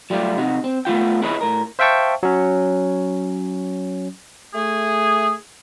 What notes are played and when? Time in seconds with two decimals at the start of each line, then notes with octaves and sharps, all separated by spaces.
0.10 F#3 G3 A3 F4 G4
0.38 C3 D#4 F#4
0.64 C4
0.85 A3 B3 F4 G5
1.22 E4 G#4 B4 C#5 D#5
1.41 A2 A#4
1.79 C5 E5 F5 G5 A5 C#6
2.23 F#3 C#4
4.54 A3 G#4